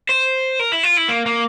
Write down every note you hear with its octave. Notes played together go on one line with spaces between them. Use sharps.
C5
A#4
E4
F4
E4
A#3
A#3